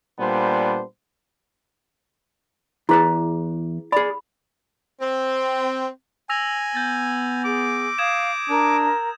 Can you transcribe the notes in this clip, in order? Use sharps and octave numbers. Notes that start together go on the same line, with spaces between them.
A#2 G3 B3 D4 C5
E2 E4 G#4 B4 A5 D6
G#4 D5 B5
C4
G#5 E6 A#6 F7
B3 G6 A6
G#4 D6
F5 D#6 G#6 E7
D4 A#4